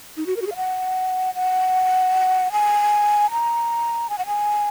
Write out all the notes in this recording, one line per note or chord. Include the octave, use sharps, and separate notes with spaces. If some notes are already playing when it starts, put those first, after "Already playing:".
D#4
F#4
A#4
F#4
G#4
F5
F#5
F#5
G#5
A#5
G#5
F#5
G#5